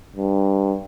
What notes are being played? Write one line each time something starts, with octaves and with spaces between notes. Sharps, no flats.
G2